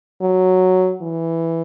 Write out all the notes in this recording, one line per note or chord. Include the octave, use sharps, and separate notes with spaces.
F#3
E3